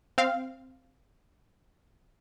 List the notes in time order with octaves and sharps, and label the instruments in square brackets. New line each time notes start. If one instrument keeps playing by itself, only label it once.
[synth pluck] C4 F5